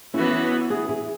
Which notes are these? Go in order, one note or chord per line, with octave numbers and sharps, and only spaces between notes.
E3 B3 C#4 E4 F#4
E4 G#4
E4 G#4